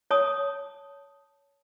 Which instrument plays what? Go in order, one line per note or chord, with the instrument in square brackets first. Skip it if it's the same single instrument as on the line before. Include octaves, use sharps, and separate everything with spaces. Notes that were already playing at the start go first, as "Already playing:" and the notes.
[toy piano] C#5 A5 D#6